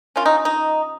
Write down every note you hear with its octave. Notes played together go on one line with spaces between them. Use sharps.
F3 A#3 C#4 F4
D#4
D#4